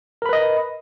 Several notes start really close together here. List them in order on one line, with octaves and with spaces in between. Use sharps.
A#4 B5 B4 D#5